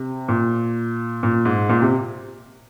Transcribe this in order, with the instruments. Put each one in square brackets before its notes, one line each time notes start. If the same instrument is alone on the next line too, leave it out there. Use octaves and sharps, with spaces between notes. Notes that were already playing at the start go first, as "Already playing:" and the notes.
Already playing: [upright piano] C3
A#2
A#2
G#2
A#2
C3